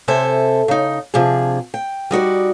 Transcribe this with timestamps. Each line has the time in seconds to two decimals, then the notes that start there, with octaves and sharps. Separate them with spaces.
0.08 C3 A4 C5 E5 G#5
0.68 C#3 D#4
1.14 C3 F3 D4 G#4
1.74 G5
2.11 G3 D#4 F#4 D5